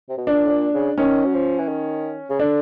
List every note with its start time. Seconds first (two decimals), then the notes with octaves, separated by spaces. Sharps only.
0.09 C3
0.18 B2
0.27 A#2 D4
0.46 A2
0.51 A#2
0.74 C#3
0.98 D#3 C#4
1.25 F#3
1.33 F3
1.58 E3
1.68 D#3
2.30 C#3
2.39 D3 D4